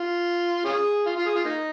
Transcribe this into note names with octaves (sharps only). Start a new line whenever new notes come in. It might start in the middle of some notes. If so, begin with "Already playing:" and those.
Already playing: F4
C#4 F4 G#4
F4
F4
G#4
F4
A#3 D#4